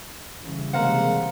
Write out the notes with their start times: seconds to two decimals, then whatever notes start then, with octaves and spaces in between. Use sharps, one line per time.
0.40 C#3 E3 G3
0.73 C3 G#3 A#3 C5 F5 F#5 A#5